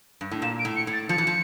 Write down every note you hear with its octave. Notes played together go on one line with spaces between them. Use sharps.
G2
A2
A#2 E7
D7
A2
C#7
A2
A6
F3 C#7
E3
F3